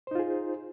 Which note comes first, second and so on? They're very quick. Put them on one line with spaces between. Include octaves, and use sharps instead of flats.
C5 D#4 F4 G#4